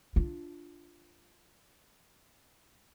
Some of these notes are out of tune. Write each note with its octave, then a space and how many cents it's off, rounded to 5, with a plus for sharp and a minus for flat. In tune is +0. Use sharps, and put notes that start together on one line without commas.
D4 +0 F4 -5